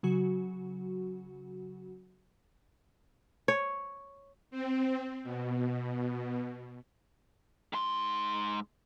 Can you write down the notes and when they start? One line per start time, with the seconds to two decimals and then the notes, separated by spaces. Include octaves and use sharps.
0.03 C#3 F#3 F#4
3.48 C#5
4.51 C4
5.24 B2
7.73 G#2 C6